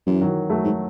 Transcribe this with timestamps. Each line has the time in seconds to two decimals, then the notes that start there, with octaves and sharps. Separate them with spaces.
0.07 F#2 E3
0.21 D#3 F#3
0.50 F#3 A3
0.64 G#2